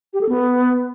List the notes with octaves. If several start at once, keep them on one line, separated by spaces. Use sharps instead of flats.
G4
A4
B3